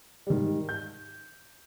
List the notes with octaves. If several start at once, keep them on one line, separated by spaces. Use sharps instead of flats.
G#2 D#3 G3
G6